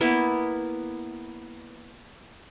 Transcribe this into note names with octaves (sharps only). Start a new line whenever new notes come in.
A#3 B3 E4